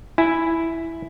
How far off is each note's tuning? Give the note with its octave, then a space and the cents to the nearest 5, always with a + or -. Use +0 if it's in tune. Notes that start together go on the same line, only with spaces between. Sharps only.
E4 +0 G#5 +0